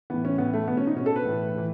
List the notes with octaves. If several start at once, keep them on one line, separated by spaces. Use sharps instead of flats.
A2 E3 B3
C#4
A2 E3 B3
A3
B2 B3
C#4
D#4
B2 C#4
A4
B4
A2 E3
A2 E3